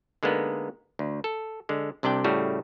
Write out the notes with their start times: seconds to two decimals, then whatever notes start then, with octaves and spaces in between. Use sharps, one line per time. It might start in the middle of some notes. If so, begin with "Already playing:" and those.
0.23 D3 G#3 A#3 B3 D#4
0.99 D2
1.24 A4
1.69 D3 G#3
2.03 C2 C3 D4 D5 G5
2.24 A2 C#3 G3 A3 F#4